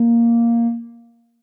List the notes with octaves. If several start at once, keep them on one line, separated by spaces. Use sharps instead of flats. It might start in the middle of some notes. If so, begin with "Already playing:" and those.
Already playing: A#3